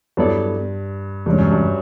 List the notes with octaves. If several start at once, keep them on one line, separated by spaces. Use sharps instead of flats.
G2 F#3 B3 E4 A4 D5
G2 C3 E3 G#3 C#4
F#2
G2